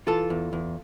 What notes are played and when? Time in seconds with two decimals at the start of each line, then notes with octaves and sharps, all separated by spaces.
0.07 E3 F4 A4
0.30 E2
0.53 E2